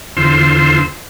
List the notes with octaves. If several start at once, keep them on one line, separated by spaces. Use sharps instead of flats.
E2 D3 F4 C5 C6 E6